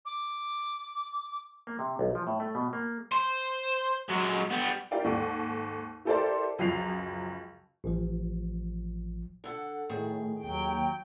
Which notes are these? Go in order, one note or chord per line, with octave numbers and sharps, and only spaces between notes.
D6
A#3
C3
B1
F3
A2
A3
B2
A#3
C5
F#3 G#3
G3 B3
E4 G4 A#4 D5 F5 G5
D#2 G#2 A4
E4 G4 A4 A#4 C5 D5
C#2 F#2 F3 C7 F7
A1 F3
D3 A4 F#5
A2 D#3 G#4
D#2 F#3 G5